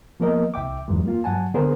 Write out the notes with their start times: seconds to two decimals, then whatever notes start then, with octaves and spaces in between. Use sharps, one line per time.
0.20 F3 A#3 B3 A#4 D#5
0.54 C2 E5 G5 D6
0.88 E2 G2 F#3 G#3
1.06 A#3 F4
1.24 G2 F#3 F#5 G#5 A5
1.54 D3 B3 G#4 A#4 C5